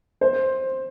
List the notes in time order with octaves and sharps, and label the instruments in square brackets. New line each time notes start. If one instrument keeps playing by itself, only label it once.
[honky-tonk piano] C5